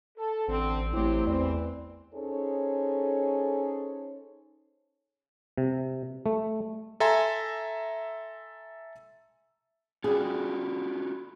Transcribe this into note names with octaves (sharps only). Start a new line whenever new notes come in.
A4
A1 D3 C4
A1 F#3 A3 C4 E4 G4
E2 E3 C4 D5
C#4 D#4 G#4 A4 C5 C#5
C3
A3
A4 E5 G#5 A#5 C6
G3 C#4 F4 F#4 G#4